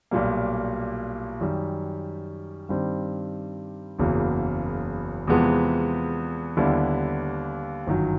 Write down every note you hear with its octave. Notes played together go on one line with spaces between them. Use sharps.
B1 A#2 G3 A#3
F#2 D#3 G3
G2 D#3 G3 C4
F#1 E2 C#3 F#3 A#3
E2 C3 F3 G#3 B3
D#2 D3 G3 B3 E4
G1 F#2 D#3 F#3